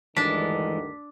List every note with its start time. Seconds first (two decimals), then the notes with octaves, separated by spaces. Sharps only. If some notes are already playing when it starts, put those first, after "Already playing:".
0.17 D2 G2 D#3 E3 G#3 D4 A5 B6